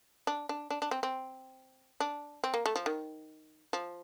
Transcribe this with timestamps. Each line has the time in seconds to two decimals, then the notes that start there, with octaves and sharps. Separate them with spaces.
0.27 D4
0.49 D4
0.70 D4
0.82 D4
0.91 C4
1.03 C4
2.00 D4
2.44 C4
2.54 A#3
2.66 A3
2.76 F3
2.86 D#3
3.73 F3